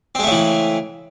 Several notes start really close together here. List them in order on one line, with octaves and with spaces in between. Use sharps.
C4 G#3 A3 C#3 E3